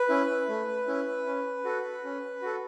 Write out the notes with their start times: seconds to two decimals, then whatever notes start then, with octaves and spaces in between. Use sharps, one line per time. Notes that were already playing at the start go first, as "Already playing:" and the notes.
Already playing: B4
0.09 C#4 E4
0.49 A3
0.87 C#4 E4
1.26 C#4
1.65 F#4 A4
2.04 C#4
2.42 F#4 A4